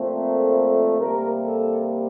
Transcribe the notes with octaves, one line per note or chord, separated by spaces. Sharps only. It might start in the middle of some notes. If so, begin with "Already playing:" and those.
Already playing: A#2 F3 A3 C4
A#4
C3 G3 A#3 A#4
A4